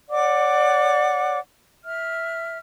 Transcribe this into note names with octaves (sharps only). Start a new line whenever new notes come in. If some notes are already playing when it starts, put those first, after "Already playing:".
C#5 D5 F#5 D6
E5 F6